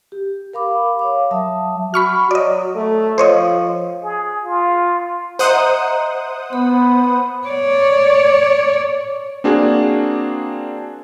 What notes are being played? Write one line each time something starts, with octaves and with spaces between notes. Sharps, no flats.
G4
A#4 F5 B5 D6
C#5 F5 D6
F#3 E5 A5 D#6
F#4 B5 C#6 F6
F#3 D5 D#5
A3
F3 C5 C#5 D#5
G#4
F4
C5 D#5 E5 F#5 A#5 D#6
B3 B5
C#5 D5
A#3 C4 D4 F#4 G#4